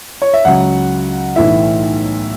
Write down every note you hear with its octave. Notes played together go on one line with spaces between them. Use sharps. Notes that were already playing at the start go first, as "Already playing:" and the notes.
C#5
E5
C#2 C#3 F#3 F#5
B1 A2 E3 E5